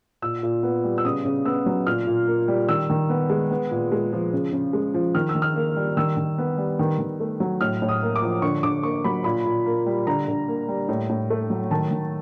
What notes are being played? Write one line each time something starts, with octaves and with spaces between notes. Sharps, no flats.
A#2 E6
A#2
B3
G3
E6
C#3 D#6
C#3
B3 E6
F#3
A#2 F6
A#2
A#3
G3
D#3 E6
D#3
B3
G#3
B3
A#2
G#3
F3
C#3
C#3
G#3
F3
D#3 F6
E6
D#3
F6
A#3
G3
D#3 E6
D#3
B3
G3
D#3
D#3
A3
F#3
A2 F6
A2
D#6
A#3
D6
F3
D3 C#6
D3 D6
A#3 C#6
F#3 B5
A#2 B5
A#2
A#3
G3
D3 A#5
D3
A#3
G3
A2
A2
A3
F#3
D#3 A5
D#3